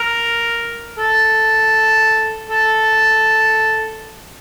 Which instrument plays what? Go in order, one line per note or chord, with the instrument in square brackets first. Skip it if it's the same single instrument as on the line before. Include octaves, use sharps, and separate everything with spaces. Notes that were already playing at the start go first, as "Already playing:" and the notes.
Already playing: [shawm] A#4
A4
A4